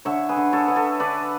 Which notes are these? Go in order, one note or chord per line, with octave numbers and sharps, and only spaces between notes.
D3 C#5 E5
G#4 B4
D3
A4 C#5
D3 B4
A4 C#5
D3 B4 D5